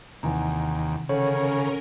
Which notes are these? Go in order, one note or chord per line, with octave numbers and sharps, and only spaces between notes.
D#2 C3 D#3 E3 F#5 G#5 A#5
C#3 C#4 A4 A#4 C#5 F#5